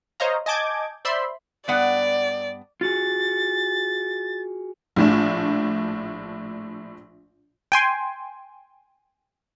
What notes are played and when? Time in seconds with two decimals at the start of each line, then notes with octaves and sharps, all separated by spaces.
0.20 C5 C#5 D#5 F5 A#5
0.46 D#5 G#5 A5 D6 G6 G#6
1.05 C5 D5 E5 B5 C6
1.68 G2 B3 D5 F#5
2.81 F4 F#4 G#4 A6
4.96 A#1 A2 D4
7.72 G5 G#5 C6